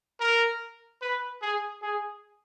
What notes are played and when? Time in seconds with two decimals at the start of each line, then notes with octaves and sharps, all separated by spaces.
0.20 A#4
1.02 B4
1.42 G#4
1.82 G#4